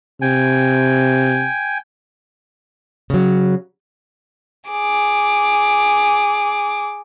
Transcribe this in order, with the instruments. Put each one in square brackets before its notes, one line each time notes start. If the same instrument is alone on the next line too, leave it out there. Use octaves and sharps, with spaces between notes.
[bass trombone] C3 [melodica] G5 G#5
[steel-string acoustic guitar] C#3 F#3
[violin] G#4 D6